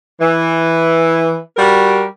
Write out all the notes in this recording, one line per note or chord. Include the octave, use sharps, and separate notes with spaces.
E3
G3 F#4 A#4